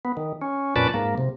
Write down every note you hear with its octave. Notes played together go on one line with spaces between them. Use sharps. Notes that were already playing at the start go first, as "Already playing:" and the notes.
B3
D#3
C#4
F2 A#2 C#4 B4 D5 A5
G#2 A#3
C3